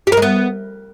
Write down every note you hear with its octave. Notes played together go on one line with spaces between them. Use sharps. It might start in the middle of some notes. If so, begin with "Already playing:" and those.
G4
A#4
G#3
B3